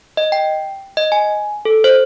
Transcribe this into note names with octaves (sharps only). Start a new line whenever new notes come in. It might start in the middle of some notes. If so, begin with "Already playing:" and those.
D#5
G5
D#5
G#5
A4
C5